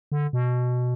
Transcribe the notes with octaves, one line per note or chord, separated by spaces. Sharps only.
D3
B2